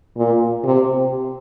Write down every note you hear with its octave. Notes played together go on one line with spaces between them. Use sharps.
A#2
C3